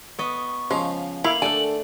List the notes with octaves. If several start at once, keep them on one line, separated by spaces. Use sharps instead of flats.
B3 D#5 C#6
C#3 F3 G#3 C5
A#3 E4 F5 F#7
D3 A3 A4 D5 G#5